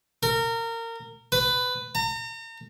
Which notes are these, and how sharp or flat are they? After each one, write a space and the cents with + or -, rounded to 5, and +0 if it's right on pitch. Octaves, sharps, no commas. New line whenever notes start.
A#4 -25
B4 +15
A#5 -40